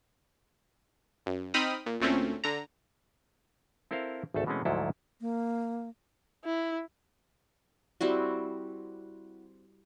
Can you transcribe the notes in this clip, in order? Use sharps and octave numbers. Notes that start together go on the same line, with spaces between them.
F#2
C4 D#4 G5 B5 D#6 F6
A#2
D2 A#2 A3 C4 C#4
D3 A#5
C4 E4 A4 A#4 C5 F5
G#1 D2 A3 A4 A5
B2 E3 G#3 A3 C4 C#4
D2 G#2 F3 F#3 E4 A4
A#3
E4
G3 C4 E4 F#4